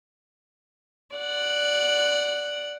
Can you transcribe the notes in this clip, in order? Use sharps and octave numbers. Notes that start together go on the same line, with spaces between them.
D5 F#5